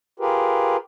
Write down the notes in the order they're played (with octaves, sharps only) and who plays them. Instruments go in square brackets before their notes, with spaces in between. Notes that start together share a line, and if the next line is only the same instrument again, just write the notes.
[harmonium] F4 G4 G#4 A#4 B4